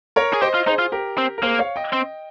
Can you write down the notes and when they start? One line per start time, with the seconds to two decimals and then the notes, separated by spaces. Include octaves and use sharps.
0.16 A#4 C#5
0.33 G#4
0.41 G4 C5 D#5
0.54 F4
0.67 D#4 G#4 C5
0.79 F4
0.92 G4 A#4
1.18 C4
1.38 A#4
1.43 A#3 G#4 C5
1.59 C#5 F5
1.76 D#5 G5
1.93 C4